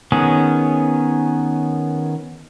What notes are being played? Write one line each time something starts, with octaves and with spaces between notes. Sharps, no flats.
D#3 B3 C#4 G#4